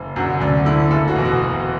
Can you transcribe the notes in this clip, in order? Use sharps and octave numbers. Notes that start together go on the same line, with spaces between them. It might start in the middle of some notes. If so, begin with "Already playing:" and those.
Already playing: F#1
F#2 D3 F#4
D2 D4
D3 A3 E4
F#1 A4
F#4
E2 B2
F#4